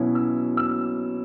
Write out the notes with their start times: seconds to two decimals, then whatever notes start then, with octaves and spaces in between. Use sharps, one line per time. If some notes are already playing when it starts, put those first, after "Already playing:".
Already playing: B2 F#3 C#4 E4
0.15 E6
0.57 E6